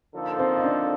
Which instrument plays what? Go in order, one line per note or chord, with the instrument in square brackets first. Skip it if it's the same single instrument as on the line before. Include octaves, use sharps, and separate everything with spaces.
[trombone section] D3 F3 A#3 D#4 A4
[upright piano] C4 C5
D#5
D4 D5